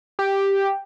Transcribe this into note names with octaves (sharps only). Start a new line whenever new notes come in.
G4